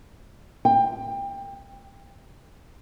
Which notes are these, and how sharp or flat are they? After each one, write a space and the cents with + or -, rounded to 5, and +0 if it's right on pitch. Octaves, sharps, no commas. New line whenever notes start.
G5 +20